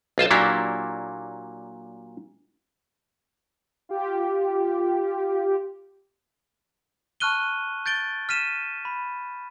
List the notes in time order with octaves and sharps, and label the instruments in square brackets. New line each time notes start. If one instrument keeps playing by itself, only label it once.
[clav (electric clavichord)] B1 F4 C5 A5
A#2 F#3 A#3 D4 E4 G4
[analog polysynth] F4 G4
[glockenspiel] A5 C#6 F6 F#6 D#7 G7
G6 A6 D7 G7
F6 B6 D#7 E7
B5